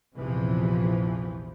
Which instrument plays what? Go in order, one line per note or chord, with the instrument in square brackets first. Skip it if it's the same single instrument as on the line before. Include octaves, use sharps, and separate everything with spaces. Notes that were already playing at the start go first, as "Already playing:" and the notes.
[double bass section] A#1 E2 C3 E3 F3